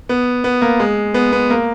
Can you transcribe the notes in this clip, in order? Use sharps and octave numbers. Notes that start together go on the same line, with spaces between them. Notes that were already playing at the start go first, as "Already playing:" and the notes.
B3
B3
A#3
G#3
B3
B3
A#3